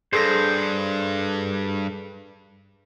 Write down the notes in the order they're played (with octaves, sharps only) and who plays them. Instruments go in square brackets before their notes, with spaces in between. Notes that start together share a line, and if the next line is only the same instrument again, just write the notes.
[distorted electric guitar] G2 [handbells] G#4 A4 A#6 [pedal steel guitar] C5